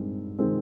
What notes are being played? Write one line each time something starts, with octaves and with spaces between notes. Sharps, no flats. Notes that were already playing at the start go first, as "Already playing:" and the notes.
Already playing: G2 D#3 G#3 C4
D#3 G#3 C4